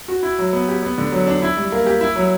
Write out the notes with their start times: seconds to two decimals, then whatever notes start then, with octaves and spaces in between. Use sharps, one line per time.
0.08 F#4
0.23 E4
0.38 F#3
0.53 B3
0.68 G4
0.83 B3
0.98 D3
1.12 F#3
1.27 D4
1.42 E4
1.57 G3
1.72 A#3
1.86 G4
2.01 E4
2.16 F#3